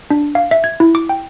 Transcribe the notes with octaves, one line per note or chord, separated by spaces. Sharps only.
D4
F5
E5
G#6
E4
D6
G5